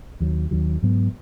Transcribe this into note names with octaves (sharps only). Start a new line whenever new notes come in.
D#2 D#3 F#3
D#2 D#3 F#3
G#2 F#3 B3